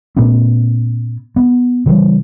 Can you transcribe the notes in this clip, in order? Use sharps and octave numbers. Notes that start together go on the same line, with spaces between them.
A#2 A3 B3 C#4
B3
C#3 E3 G3